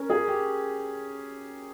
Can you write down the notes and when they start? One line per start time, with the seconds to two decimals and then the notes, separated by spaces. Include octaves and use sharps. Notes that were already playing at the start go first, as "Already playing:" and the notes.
Already playing: C#4 A#4
0.10 G#4
0.28 G4